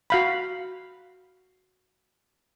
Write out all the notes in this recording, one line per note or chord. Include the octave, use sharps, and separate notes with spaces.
F#4 F5 B5